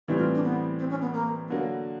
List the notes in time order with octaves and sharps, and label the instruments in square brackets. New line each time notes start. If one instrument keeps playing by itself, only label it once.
[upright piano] A2 E3 G3 C4 [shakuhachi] E4
[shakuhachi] F4
D4
B3
C4
C#4
B3
A#3
[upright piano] D3 F#3 A#3 [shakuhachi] B3